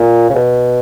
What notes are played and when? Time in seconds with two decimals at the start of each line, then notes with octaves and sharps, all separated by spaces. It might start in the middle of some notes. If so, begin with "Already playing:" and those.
Already playing: A#2
0.30 C#3
0.35 B2